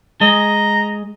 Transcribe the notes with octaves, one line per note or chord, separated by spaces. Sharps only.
G#3 D#5 A#5